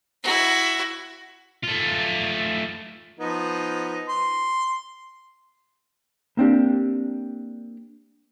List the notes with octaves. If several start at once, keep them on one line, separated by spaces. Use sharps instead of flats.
E4 F#4
A3 F4
F3 B3 D#4
C6
A#3 C4 D4 G4